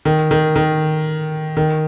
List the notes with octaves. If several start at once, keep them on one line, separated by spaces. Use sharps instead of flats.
D#3
D#3
D#3
D#3